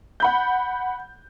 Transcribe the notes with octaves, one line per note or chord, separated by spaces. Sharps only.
F#5 B5 G6